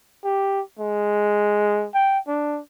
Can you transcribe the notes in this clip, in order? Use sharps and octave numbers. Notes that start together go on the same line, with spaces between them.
G4
G#3
G5
D4